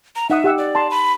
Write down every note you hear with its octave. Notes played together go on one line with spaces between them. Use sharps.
A#5
D#4 E5 F#5 D#6
G4 F#5 E6
D5
A5 A#5 C6
B5